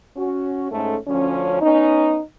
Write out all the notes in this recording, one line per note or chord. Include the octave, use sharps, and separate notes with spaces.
C#4 F#4
G#2 A3 C#4 A4
D2 F3 C#4
B3 C#4 D#4